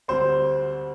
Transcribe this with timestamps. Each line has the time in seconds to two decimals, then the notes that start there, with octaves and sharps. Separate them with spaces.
0.08 D2 D3 G3 C4 C5